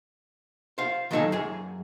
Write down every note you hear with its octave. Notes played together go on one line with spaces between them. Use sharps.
C5 F5
D#3 F#3 D#4 F4 A4 G#5
F#2 G#4 G#5